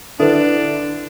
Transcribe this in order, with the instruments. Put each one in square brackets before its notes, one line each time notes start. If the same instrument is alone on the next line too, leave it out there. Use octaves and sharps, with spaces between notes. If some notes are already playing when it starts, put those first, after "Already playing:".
[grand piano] D3 [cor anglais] D4 [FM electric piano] E4 [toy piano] A4 B4 C5